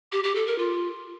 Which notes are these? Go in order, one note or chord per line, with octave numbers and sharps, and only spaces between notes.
G4
G4
A4
A#4
F4